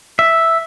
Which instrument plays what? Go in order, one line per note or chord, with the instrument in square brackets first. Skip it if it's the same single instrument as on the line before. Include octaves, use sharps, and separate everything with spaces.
[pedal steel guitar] E5